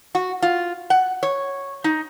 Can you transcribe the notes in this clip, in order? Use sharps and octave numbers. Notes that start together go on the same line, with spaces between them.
F#4
F4
F#5
C#5
D#4